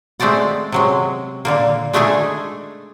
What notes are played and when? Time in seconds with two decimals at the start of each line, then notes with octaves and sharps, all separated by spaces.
0.20 G#3 A3 C4 D5 F#5
0.72 C3 F#3 G#3
1.45 A#2 D3 A#3
1.93 G#3 A3 D4 D#4 G#4